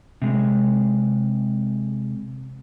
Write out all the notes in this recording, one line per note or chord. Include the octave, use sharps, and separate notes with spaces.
C3 G#3